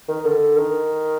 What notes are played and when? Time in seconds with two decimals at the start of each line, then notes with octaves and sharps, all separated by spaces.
0.08 D#3
0.25 D3
0.57 D#3